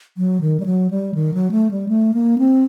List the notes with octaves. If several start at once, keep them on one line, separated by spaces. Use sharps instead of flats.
F#3
D#3
G3
F#3
G3
D#3
F#3
A3
G3
A3
A#3
C4